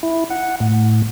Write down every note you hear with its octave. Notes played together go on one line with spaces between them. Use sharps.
E4
F#5
A2